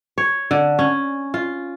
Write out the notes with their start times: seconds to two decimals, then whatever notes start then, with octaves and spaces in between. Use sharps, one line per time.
0.18 C#5
0.51 D3
0.79 C#4
1.34 F4